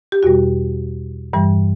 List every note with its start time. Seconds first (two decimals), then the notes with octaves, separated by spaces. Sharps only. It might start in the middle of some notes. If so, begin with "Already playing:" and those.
0.12 G4
0.23 E2 B2 G3 F#4
1.33 G2 E3 G3